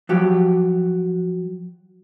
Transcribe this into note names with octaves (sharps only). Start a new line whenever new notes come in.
F3 F#3 G4